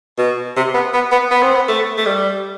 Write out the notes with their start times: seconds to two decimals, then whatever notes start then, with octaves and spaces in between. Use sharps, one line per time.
0.18 B2
0.56 C3
0.74 B3
0.94 B3
1.12 B3
1.31 B3
1.43 C4
1.55 B3
1.68 A3
1.98 A3
2.06 G3